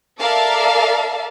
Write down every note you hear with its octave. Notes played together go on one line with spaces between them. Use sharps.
A4 A#4 D5 E5 F5 A5